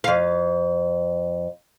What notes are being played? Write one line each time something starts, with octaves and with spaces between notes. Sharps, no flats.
F2 F5